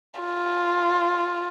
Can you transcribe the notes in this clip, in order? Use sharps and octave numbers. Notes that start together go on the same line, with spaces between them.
F4